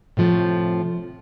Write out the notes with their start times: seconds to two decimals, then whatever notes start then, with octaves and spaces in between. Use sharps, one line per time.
0.17 A2 C3 F3 G#3 A3